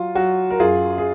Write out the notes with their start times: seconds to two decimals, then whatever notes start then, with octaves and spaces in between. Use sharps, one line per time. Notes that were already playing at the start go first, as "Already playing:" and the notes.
Already playing: F#3 F4
0.15 F#3 F#4
0.51 A#4
0.60 F#2 F4 G#4
0.98 G#4